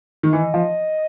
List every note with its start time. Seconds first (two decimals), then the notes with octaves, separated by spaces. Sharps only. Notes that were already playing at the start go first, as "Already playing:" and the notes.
0.23 D#3
0.32 E3 D#5
0.54 F3